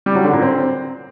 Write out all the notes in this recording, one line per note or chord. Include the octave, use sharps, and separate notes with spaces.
G3
F#3
D3
A#2
C4